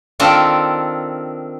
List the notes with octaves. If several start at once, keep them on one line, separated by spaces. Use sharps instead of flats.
D#3 C4 D4 F4 A4